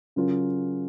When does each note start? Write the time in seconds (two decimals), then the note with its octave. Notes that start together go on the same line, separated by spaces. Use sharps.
0.16 C#3 F#3 C#4 F4 A#4